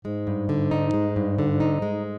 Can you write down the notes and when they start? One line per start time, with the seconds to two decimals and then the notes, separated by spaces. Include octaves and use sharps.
0.05 G#2 G#3
0.27 G2
0.49 D3
0.71 D#4
0.94 G#3
1.16 G2
1.39 D3
1.60 D#4
1.82 G#3